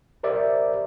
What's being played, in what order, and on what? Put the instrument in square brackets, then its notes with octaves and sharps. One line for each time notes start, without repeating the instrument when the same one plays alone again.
[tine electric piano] G4 A#4 C5 D5 E5